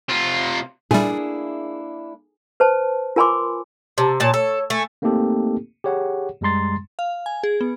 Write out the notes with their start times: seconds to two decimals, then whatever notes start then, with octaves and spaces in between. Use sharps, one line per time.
0.09 C3 F4
0.91 A#2 G3 A#3 D4 E4 G#4
2.60 B4 C5 A5
3.16 F4 A#4 G#5 B5 C6 D6
3.98 C3 A5
4.20 A#2 C#5 A5
4.34 A4 C#5
4.70 A3 G#5
5.02 A3 A#3 C4 D#4 G4 A4
5.84 G4 G#4 C#5 F#5
6.41 F#2 G3 G#3 A#5 C6 A6
6.99 F5
7.26 G#5
7.43 G#4
7.61 B3